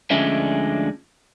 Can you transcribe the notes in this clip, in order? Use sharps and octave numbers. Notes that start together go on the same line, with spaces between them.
D2 D3 F3 G#3 C#4 E5